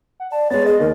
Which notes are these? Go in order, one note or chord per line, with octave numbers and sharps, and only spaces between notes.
F#5
D5 A5
G#3 B3 C#5 A6
G#4 D#5
D#2 A#4